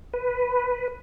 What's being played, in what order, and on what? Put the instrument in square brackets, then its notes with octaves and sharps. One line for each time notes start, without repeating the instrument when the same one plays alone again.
[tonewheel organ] B4